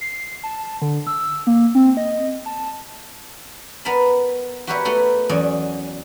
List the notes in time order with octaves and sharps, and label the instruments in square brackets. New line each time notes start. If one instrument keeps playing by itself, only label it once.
[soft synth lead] C7
A5
D3
E6
A#3
C4
D#5
A5
[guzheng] B3 A#4 A5 B5
F#4 G4 A#4 B4 C#5 E5
A3 B3 F#4 A4 A#4
E2 F#3 C#4 D5 D#5 G#5